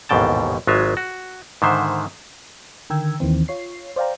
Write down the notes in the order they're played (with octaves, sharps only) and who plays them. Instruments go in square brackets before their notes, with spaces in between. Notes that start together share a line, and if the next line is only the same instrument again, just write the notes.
[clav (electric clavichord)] A1 D#2 G#2 B2 G5 A5
G#1 F#3 G#3 F4 E5
F#4
G#2 D3 D#3 C5 E5
[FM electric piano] D3 D#3 A#4 G5 E6 G#6
D#2 D#3 E3 A#3 C4
F4 C#5 C7
C5 D5 F5 G5 A#5